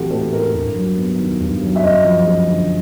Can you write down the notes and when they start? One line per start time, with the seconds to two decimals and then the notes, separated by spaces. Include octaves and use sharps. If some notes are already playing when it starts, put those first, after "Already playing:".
Already playing: A2 E3 G#3 C4 F#4 G4 A4
0.11 A2 A4
0.32 G#3 A#4
0.54 G2
0.75 F#3
0.97 B3
1.19 D#3
1.40 G2
1.61 F#3
1.76 E5
1.83 F#2 D#5
2.04 F3
2.26 G#3
2.48 D3